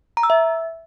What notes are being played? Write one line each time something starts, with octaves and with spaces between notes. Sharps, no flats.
A#5
E6
E5